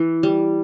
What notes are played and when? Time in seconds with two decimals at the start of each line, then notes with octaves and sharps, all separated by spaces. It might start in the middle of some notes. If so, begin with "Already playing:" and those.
Already playing: E3
0.23 G3